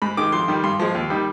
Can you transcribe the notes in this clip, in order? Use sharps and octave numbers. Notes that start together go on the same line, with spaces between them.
G#2 B5
D#3 G#3 D6
F2 C6
D#3 G3
G2 C6
F3 G#3
D#2
D#3 G3